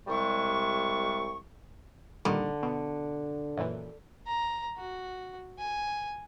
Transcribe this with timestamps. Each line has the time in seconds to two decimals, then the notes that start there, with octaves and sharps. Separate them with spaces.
0.07 C2 G3 G#3 E5 C#6
2.25 A#1 D3 D#3 G3
2.63 B2
3.57 F#2 A#2 E3
4.27 A#5
4.78 F#4
5.59 G#5